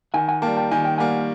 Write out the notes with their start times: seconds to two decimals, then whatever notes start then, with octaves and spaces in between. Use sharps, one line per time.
0.14 D#3 F#5 G#5
0.28 F#5 G#5
0.42 G3 A#3 G5 A5
0.57 G5 A5
0.71 D#3 G#5
0.85 G5
0.98 G3 A#3 F#5 G#5